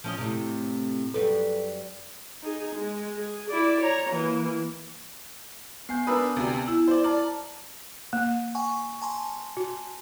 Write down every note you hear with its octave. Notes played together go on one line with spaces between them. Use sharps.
F3 C#4 D#5
A2 C3
F#2 G3 A4 B4
D#4 G#4
G#3
G#4
E4 D5
C#5 A#5
E3 A#3
B3 G#5 G6 C7
D4 A#4 B4 D#6 E6
D2 C3
E4 E6
C5 D5
D5 A5 A#5 F6
A#3
F#5 G#5 C#6
G#5 A5 C6
F#4